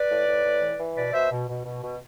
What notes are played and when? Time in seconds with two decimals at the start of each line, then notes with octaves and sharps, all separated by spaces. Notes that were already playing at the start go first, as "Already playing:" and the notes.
Already playing: B4 D5
0.11 A2
0.28 A2
0.45 A2
0.62 E3
0.79 E3
0.96 B2 B4 D5
1.13 B2 C5 E5
1.31 B2
1.48 B2
1.65 B2
1.83 B2